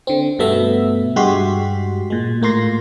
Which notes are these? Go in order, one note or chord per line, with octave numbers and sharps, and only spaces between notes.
D3 C4
G2 B2 A3 B3 E5
G2 G#3 F#4 G4 C6 B6
A#2 G#3
A2 A#3 F4 C6 A#6